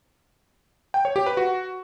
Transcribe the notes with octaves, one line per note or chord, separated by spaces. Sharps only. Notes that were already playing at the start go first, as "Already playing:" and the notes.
G5
C#5
G4
B4
F#4